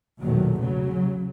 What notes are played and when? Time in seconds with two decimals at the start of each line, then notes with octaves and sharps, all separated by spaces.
0.22 B1 E2 A#2 D#3 F#3 A3
0.60 C#3 F#3